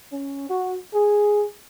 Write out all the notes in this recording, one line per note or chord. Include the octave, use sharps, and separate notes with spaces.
C#4
F#4
G#4